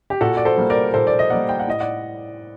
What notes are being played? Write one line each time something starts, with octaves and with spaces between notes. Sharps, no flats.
G4
A#2 F#4 A4
D5
A4 C5
G3 A#3
A#4 D5
A#2 A4 C5
D5
D#5
G3 A#3 D5 F#5
G5
F#5
A2 D#5
D5 F#5